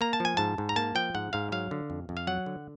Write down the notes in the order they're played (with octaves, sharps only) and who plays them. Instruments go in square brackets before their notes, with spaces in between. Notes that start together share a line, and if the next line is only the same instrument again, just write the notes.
[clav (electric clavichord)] A#3 A#5
A5
F3 G#5
G#2 A5
G#2
A#5
A#3 A5
F3 G5
G#2 F#5
G#2 F5
F#3 F5
D3
F2
F2
F5
F#3 F#5
D3